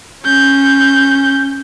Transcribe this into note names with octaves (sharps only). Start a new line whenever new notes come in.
C#4 G6